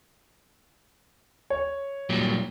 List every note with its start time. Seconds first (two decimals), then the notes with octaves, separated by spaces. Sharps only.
1.50 C#5
2.10 A#2 F#3 G3